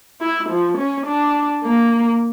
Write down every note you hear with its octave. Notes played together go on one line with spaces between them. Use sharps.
E4
F3
C#4
D4
A#3